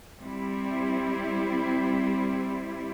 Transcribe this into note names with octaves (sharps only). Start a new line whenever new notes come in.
G3 C4 E4